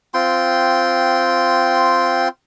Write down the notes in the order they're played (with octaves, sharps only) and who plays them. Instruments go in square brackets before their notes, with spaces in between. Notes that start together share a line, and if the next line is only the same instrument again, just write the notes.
[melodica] C4 F4 G5 C6